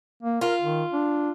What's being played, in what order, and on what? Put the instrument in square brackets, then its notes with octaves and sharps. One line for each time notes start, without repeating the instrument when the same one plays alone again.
[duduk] A#3
[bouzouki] F4 [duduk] A#4
[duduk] D#3
D4